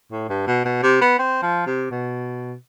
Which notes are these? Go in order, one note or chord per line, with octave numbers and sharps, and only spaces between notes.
A2
G2
B2
B2
C3
B3
C4
F3
C3
B2